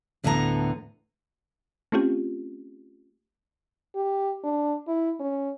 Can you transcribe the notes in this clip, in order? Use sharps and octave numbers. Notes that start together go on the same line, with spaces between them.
D2 A2 D3 B3 F#5 A#5
A3 C4 C#4 F4 G4
G4
D4
E4
C#4